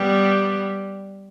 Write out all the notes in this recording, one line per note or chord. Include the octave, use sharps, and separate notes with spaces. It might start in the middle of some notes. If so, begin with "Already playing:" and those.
Already playing: G3 B3